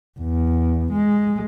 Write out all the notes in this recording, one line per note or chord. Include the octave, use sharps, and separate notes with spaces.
E2
G#3